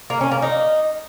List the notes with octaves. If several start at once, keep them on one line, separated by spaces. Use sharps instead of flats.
A#3
C#4
A#3
D#4